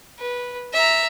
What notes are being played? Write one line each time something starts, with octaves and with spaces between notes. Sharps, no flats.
B4
E5 A#5